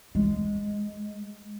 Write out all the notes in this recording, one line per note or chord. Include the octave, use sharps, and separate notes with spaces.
G#3